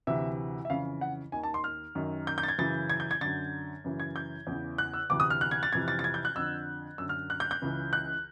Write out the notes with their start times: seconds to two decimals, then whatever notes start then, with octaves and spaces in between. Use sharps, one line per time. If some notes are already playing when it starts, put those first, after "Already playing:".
0.07 D2 C3 E3 E5
0.65 E5
0.70 F2 C#3 E3 F5
1.01 F#5
1.32 D#2 D#3 G#5
1.43 A5
1.54 C6
1.64 F6
1.95 F#2 D#3
2.27 G6
2.38 G6
2.43 A6
2.48 G#6
2.58 F#2 C#3 E3 A6
2.90 G#6
3.00 G6
3.11 G#6
3.21 F#2 D3 A6
3.84 F#2 C#3 E3
4.00 G#6
4.16 G6
4.47 E2 C#3 E3
4.78 F#6
4.94 E6
5.10 D2 C3 E3 D6
5.20 D#6
5.30 F6
5.41 F#6
5.51 G#6
5.63 A6
5.72 F2 C3 E3 G#6
5.88 A6
5.99 A6
6.04 G#6
6.14 G6
6.25 F#6
6.35 F2 D3 E6
6.98 F#2 D3 E6
7.09 F6
7.30 F#6
7.40 G6
7.51 G6
7.62 C#2 C#3 E3
7.93 F#6